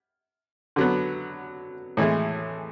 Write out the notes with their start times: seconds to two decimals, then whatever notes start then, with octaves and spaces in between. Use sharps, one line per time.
0.76 D3 F#3 B3
1.97 A2 E3 G#3